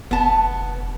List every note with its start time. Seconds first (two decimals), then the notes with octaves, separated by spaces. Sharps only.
0.11 F1 B3 A5